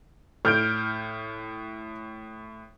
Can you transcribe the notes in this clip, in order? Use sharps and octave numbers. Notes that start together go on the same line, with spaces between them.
A2 F6 G6 D7